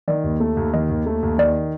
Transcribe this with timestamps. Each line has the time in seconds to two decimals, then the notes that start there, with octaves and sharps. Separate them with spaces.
0.08 D#3 D5
0.24 D#2
0.40 A3
0.57 D#2
0.74 D#3 D#5
0.89 D#2
1.06 A3
1.23 D#2
1.38 D#3 D5